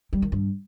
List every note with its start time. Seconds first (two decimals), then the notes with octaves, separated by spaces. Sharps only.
0.13 G3
0.22 D#3
0.32 G2